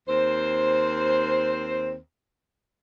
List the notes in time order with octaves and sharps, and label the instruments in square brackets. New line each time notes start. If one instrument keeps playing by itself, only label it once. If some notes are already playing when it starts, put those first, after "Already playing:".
[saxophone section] D#2 C4 C5